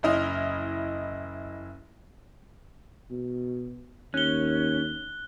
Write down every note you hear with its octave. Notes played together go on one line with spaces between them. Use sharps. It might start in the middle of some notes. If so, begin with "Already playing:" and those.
F#1 E4 D#5 F6
B2
D#2 C#4 F#6 G7